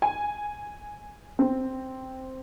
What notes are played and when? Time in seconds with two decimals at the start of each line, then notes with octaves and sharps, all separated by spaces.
0.02 G#5
1.39 C4